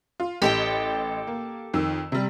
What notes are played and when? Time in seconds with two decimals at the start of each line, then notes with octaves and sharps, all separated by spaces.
0.20 F4
0.42 A1 G4 A4 D#5 G5
1.27 A#3
1.74 F2 D#3 E6
2.12 C3 G3